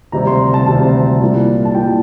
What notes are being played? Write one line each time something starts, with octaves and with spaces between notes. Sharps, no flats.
D2 C3 G3 C4 A#5
C6
A5
D2 C3 G3 C4 A5
C2 A#2 G3
A5
C2 A#2 G3 G5